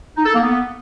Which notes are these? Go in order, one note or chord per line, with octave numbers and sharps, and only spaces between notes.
D#4
A4
A#3
B3